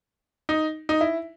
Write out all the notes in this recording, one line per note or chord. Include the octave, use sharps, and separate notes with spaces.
D#4
D#4
E4